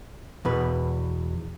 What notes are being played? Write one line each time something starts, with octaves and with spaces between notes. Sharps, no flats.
E2 B2 B4